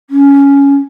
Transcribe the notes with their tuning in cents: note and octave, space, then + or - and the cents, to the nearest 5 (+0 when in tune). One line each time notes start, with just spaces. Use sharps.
C#4 +10